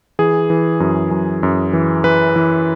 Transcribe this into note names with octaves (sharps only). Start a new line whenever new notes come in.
E3 G#4
E3
F#2
F#2
F#2
E3
E3 B4
E3